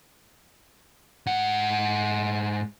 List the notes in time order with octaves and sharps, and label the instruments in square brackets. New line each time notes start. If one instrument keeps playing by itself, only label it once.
[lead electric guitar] G#2 F#5